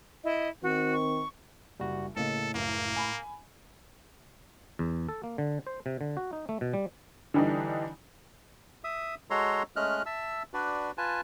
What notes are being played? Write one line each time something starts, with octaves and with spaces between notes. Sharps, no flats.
E4 D#5
D#3 C4 F#4
C#6
F#1 G3 F#4
A2 C#3 A#3 A4 D#5
F#1 C#2 A#3
G#5 B5
E2
A4
A#3
D3
C5
C3
D3
F#4
D#4
A3
B2
G3
D3 E3 G3 D4 D#4
E5 D#6
G#3 F#4 A4 C#5 A#5 C6
G#3 A3 C#4 D#5 F6 F#6
E5 A5 E6
D4 F#4 B4 D5
F4 B4 G#5 A5